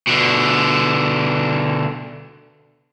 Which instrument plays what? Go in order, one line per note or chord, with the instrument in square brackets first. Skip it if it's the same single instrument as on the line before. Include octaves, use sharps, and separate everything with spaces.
[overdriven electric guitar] B2 D3